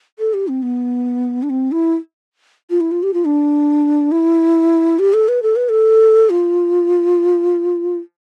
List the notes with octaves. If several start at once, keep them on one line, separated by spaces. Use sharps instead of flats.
A4
G4
C4
B3
D4
C4
E4
F4
E4
F4
G4
F4
D4
E4
G4
A4
B4
A4
B4
A4
F4